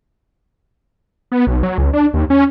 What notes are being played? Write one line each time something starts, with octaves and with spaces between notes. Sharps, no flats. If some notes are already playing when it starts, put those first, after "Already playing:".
B3
B1
F#3
C#2
D4
D#2
C#4